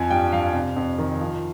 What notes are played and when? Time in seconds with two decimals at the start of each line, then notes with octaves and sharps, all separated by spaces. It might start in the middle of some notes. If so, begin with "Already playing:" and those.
Already playing: F2 F3 G#5
0.10 G2 G5
0.33 G2 F5
0.54 C3
0.76 F2
0.98 D#3
1.20 F3